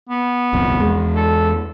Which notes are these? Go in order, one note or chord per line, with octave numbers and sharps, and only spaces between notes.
B3
D#1 C2 F2
E2 G#3
A4